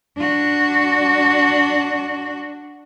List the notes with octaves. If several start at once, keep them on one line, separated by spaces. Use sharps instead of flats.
D4 F#4